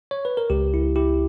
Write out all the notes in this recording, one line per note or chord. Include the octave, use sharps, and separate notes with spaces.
C#5
B4
A#4
C#2 G4
E4
E4 G4